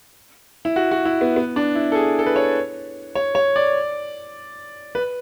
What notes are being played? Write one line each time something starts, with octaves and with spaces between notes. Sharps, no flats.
E4
F#4
F#4
E4
B3
B3
D4
E4
A4
G#4
A4
B4
C#5
C#5
C#5
D5
B4